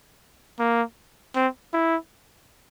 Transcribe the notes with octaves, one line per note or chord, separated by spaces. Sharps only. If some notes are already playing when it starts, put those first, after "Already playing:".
A#3
C4
E4